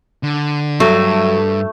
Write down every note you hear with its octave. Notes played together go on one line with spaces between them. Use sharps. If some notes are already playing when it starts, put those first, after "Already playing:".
D3
G2 F#3 A3